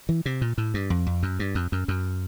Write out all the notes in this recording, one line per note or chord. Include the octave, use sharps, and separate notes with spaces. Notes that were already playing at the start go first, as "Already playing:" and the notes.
E3
C3
A#2
A2
G2
F2
F2
F#2
G2
F2
F#2
F#2